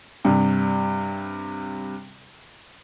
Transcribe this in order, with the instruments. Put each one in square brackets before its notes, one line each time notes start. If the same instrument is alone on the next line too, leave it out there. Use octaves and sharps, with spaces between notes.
[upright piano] G2 C3